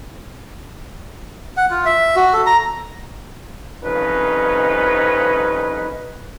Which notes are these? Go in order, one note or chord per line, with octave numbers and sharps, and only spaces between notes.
F#5
F4
E5
F#4
A4
A#5
C2 F2 F3 C#4 D#4 B4